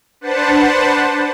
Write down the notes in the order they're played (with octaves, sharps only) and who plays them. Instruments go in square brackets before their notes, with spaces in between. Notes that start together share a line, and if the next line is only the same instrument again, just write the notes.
[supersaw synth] D4 B4 C5 F#5 A5